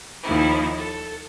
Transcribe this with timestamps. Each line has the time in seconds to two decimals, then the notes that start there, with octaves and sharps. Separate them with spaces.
0.24 D#2 D#3 F3 E4
0.77 A4